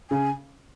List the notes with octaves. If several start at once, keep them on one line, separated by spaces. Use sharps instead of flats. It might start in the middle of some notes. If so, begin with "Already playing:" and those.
C#3 G#5